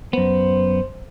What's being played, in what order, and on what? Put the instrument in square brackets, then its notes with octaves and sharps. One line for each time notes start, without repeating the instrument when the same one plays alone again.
[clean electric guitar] F#2 B3 [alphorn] C5